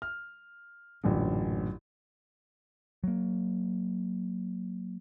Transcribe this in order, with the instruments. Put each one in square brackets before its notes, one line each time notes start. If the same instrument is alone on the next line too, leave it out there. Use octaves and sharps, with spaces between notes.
[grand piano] F6
A1 F#2 A#2 D3
[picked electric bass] F#3 A#3